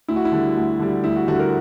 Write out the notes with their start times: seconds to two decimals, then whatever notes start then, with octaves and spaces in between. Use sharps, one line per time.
0.08 D2 E4
0.16 F#4
0.25 E4
0.32 D3 G3
0.56 D2
0.79 D3 G3
1.04 D2 E4
1.16 F#4
1.27 D3 G3 F#4
1.39 A#4